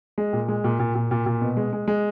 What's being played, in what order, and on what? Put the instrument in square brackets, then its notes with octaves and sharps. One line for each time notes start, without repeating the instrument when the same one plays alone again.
[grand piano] G#3
A#2
G#3
A#2
A#2
A#2
A#2
A#2
B2
G#3
G#3
G#3